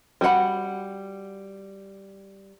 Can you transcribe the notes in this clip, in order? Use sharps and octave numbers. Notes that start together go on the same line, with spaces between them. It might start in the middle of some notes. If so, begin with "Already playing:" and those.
G3 F#4 B4 F#5 B5